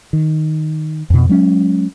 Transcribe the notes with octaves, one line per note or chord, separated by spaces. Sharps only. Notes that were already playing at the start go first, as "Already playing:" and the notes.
D#3
F2 B2
F#3 G#3 C#4